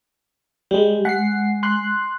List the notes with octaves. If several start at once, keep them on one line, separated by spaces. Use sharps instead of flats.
G3 G#3 G4
G#3 F#5 C7
C6 F#6